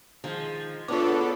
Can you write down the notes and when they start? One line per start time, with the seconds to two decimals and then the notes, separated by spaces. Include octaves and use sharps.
0.24 D#3 F3 G#3
0.88 A2 B3 C#4 D4 F4 A4 B4 D6